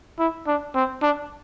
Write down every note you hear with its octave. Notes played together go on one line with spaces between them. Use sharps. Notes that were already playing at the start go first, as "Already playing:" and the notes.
E4
D4
C4
D4